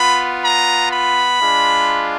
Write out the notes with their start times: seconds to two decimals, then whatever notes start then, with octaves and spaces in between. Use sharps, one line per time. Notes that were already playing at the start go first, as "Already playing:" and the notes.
Already playing: B3 F4 B5
0.42 A#5
0.91 B5
1.40 G#3 D4 F4